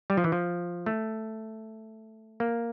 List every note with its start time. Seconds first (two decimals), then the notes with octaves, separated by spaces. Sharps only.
0.10 G3
0.17 F3
0.24 E3
0.32 F3
0.86 A3
2.40 A#3